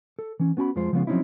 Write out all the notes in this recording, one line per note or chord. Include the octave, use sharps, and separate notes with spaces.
A4
E3 C#4
B3 C#4 F#4 G#5 B5
F2 G#3 F4 C5
C#3 F3 G#3 B3 C#4 F4
F3 F#3 C4 C#4 D#4 E4